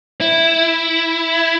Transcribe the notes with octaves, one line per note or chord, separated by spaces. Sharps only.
E4